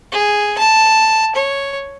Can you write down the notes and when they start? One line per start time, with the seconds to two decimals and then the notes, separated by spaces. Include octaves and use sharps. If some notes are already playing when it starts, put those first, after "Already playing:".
0.12 G#4
0.58 A5
1.35 C#5